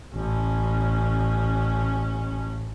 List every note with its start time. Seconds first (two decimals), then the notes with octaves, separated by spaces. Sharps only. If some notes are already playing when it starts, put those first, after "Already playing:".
0.14 A1 C#4